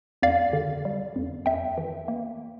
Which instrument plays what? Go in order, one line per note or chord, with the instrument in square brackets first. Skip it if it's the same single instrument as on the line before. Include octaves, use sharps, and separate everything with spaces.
[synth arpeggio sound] F2 D5 F5
D3
G3
F2
F2 E5 G5
E3
A#3